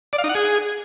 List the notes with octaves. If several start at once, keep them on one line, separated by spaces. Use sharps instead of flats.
D5
F5
D#4
F#5
G#4